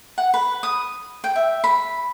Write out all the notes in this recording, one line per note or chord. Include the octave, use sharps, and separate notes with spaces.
F#5
B4
D#6
G5
E5
B5